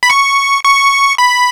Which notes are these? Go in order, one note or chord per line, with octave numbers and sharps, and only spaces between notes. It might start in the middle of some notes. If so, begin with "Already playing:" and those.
B5
C#6
C#6
B5